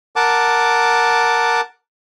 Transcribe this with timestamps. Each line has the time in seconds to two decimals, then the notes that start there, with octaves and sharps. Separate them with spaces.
0.16 A#4 F#5 A5 D6